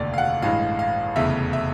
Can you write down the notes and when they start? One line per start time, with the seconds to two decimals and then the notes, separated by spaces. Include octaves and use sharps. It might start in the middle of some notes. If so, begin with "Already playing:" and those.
Already playing: F1 D#2 D3 D5
0.14 F5
0.18 F#5
0.42 A1 G2 E3 G#3 F5
0.79 F5
1.16 F1 E2 C#3 E5
1.53 E5